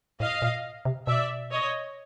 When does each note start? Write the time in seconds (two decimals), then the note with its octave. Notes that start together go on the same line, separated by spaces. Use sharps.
0.20 A2 D#5 F5
0.42 A#2
0.85 C3
1.07 B2 D5 E5
1.51 C#5 D#5